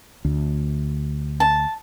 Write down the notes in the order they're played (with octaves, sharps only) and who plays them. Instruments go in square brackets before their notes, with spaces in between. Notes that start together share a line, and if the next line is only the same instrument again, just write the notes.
[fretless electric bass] D2
[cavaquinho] A5